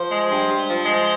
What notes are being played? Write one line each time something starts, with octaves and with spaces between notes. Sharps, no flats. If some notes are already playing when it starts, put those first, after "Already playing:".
Already playing: F3 C5
G#3
G2
G2
F3
G#3